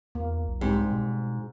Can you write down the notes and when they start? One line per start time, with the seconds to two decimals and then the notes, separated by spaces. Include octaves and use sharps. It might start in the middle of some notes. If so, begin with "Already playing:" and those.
0.15 E2 A#3
0.48 B1
0.61 G#2 G3 C4
0.92 B2